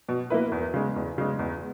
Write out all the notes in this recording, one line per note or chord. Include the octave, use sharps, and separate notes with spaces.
B2
A#3 E4 B4
E2
C#3 G#3
E2
C#3 G#3
E2